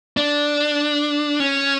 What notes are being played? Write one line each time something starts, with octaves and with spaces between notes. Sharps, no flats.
D4
C#4